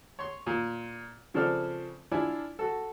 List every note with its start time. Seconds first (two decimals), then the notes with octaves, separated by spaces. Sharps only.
0.19 C#5 C6
0.47 A#2
1.34 C#3 F3 C4 A4 D5 F6
2.12 D4 E4 F4 G#5
2.59 F#4 A4